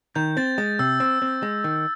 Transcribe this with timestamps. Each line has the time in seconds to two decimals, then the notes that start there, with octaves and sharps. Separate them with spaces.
0.15 D#3 G6
0.37 C4 A6
0.58 G#3 A6
0.79 C3 E6
1.00 C4 E6
1.22 C4
1.43 G#3
1.64 D#3